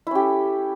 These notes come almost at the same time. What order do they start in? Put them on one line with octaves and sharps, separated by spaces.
E4 C#4 G4 A4